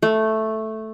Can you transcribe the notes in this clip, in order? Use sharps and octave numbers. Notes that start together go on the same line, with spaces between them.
A3